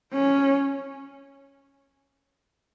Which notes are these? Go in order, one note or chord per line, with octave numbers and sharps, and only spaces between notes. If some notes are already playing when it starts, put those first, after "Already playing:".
C#4